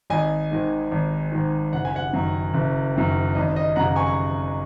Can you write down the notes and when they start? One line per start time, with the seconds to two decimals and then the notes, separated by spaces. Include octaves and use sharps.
0.10 G#1 D#5 G#5
0.51 G#2 D#3
0.92 G#1
1.32 G#2 D#3
1.73 F#1 F#5
1.85 G#5
1.96 F#5
2.13 F#2 D#3
2.54 F#1
2.96 F#2 D#3
3.35 G#1 D#5
3.56 D#5
3.76 F#2 C#3 F#5 A#5
3.96 G#5 C#6
4.07 C#6